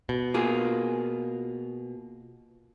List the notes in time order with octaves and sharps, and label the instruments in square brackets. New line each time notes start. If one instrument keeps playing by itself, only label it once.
[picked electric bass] B2
[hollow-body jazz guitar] A#3 F4 G#4